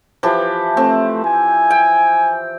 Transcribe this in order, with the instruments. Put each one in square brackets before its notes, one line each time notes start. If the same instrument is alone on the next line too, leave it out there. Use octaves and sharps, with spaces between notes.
[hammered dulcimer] E3 F3 G4
[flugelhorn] A3 [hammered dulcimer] C4
[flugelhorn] G#5
[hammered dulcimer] G5